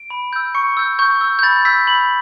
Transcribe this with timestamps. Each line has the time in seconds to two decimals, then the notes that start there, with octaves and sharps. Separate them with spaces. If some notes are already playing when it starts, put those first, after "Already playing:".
Already playing: D7
0.10 B5
0.33 E6 G6
0.55 C#6 C#7
0.77 E6 G6
0.99 C#6 G6
1.21 E6 G6
1.39 G6
1.43 B5 A6
1.65 E6 G6 B6
1.87 B5 F#7